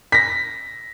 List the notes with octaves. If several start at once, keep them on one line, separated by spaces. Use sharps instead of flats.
A#6 B6